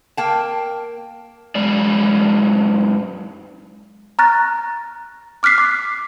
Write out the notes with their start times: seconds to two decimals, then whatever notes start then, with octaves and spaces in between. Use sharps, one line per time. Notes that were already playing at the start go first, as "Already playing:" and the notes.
0.17 A#3 G5 A5
1.55 F#2 G#3 D5
4.19 A#5 C#6 F6 F#6 A6 A#6
5.43 D6 F6 F#6 B6 C7
5.58 D6